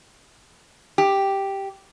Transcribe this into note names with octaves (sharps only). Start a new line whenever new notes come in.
G4